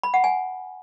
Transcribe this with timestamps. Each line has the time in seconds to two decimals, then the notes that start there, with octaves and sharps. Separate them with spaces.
0.03 B5
0.14 F#5
0.24 G#5